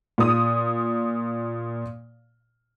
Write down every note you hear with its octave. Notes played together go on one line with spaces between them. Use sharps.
A#2 D#6